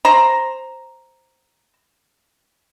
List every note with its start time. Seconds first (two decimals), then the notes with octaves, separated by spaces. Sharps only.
0.05 C5 A#5